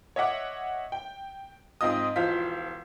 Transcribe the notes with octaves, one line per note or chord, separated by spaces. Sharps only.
C#5 D#5 E5 F#5 D6
G5
G#2 C4 F4 D#5 D#6
E1 F3 F4 C5 F5 B6